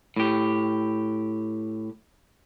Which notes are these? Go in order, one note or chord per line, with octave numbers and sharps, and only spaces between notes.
A2 G4